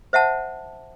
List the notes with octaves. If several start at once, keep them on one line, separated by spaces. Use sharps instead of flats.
C5 E5 F#5 A5